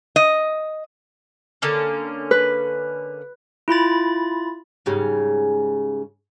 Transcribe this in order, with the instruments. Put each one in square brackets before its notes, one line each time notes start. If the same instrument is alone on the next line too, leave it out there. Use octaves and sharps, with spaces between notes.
[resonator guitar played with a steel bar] D#5
[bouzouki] D3 A#3 C#4
[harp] B4
[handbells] E4 F4 B5 A6
[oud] G#2 C#3 G3